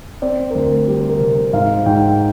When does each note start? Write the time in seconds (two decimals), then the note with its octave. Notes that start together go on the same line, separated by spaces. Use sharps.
0.22 C4 D5
0.51 A#4
0.55 D2 C5
0.88 G3 G4
1.01 C5
1.09 A#4
1.20 C3
1.53 G#2 F5
1.86 G#2 G5